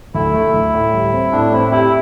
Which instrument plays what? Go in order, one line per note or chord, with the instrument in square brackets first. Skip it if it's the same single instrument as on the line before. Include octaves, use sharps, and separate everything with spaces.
[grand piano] D2 [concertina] E4
[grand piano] A3
D2
A2
G3
C4
[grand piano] A2 [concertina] D4
[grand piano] C4 [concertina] E4
[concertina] E4 [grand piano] G4